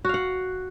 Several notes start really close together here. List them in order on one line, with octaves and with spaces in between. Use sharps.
F#4 F5 F#5